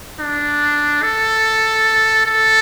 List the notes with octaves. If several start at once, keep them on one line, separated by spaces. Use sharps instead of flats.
D4
A4
A4